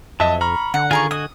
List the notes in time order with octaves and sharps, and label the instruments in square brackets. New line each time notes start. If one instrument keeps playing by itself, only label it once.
[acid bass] F2 [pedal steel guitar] F#3 E5 [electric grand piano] D#5 A5
[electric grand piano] A#5 [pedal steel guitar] B5 C#6 F6
[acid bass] D3 [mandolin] F#5
[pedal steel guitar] D#3 F4 G#5 [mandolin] G#4 A#4 C#6
[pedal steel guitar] F#4 D#5 G#5 [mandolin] D#6